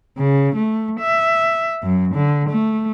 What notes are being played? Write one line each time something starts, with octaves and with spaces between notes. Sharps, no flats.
C#3
A3
E5
F#2
D3
A3